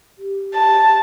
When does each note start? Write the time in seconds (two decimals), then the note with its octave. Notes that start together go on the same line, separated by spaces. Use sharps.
0.19 G4
0.55 A5